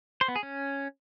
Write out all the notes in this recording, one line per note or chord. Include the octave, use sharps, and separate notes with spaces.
C5
B3
G#4
C#4